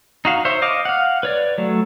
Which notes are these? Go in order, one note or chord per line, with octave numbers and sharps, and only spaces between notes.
D#4 F#4 F5
C5 C#5 E5
D#5 F5 D6
F5 F#5
B4 C#5 D5
F#3 A3